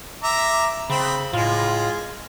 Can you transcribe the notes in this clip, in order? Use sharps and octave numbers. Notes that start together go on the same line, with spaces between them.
E5 A#5 D6
C#3 C4 B5
A2 G#3 F4